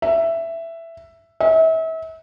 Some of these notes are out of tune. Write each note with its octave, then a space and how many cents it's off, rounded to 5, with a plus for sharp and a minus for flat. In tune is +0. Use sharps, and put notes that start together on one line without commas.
E5 +10
E5 -35